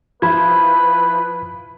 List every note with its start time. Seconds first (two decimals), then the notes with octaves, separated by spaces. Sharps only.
0.22 F3 E4 B4 B5 G#6